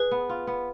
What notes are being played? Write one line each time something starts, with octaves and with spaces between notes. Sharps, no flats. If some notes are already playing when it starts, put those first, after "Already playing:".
Already playing: G#4 B4
B3
F4
B3